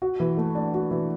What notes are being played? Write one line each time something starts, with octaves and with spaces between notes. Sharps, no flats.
F#4
E3
A3
D4
F#4
E3